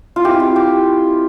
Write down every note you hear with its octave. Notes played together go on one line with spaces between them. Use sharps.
F4
G#3 C4 E4 G4
F4
G4